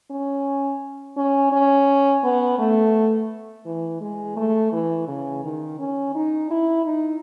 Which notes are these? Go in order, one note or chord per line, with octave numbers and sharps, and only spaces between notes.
C#4
C#4
C#4
B3
A3
E3
G#3
A3
E3
C#3
D#3
C#4
D#4
E4
D#4